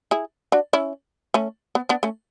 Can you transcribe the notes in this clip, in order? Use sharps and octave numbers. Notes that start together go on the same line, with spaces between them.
E4 G#4
D4 F#4
C#4 E4
A3 C#4
B3
B3 D4
A3 C#4